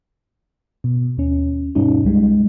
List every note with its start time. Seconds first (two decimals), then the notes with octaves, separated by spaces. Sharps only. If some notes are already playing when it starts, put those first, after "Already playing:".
0.84 B2
1.18 D#2 C#4
1.75 G2 B2 G3 C#4 D#4
2.04 C2 G3 G#3